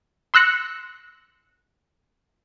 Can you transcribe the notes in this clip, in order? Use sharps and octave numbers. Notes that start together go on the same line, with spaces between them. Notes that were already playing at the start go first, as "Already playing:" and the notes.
C6 E6 F#6 A#6 C#7